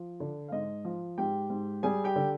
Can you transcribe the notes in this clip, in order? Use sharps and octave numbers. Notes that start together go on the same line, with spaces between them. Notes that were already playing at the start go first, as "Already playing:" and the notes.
Already playing: F3
D3
F5
G#2 D#5
F3
G#2 G4 G5
G#2
G3 G#4 G#5
G4 G5
D3